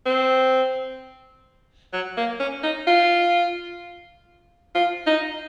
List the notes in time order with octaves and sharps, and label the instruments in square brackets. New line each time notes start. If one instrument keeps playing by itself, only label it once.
[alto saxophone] C4
F#3
A#3
C#4
D#4
F4
F4
D#4